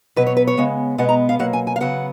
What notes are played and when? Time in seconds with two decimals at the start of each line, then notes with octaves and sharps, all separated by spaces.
0.16 B2 F#3 B3 B4
0.27 C#5
0.37 B4
0.47 C#5
0.57 C#3 G#3 B3
0.98 B2 G#3 B3 F#5
1.09 A#5
1.29 F5
1.39 B2 F#3 A#3 F#5
1.53 G#5
1.67 G#5
1.76 F5
1.81 C#3 F#3 B3 F#5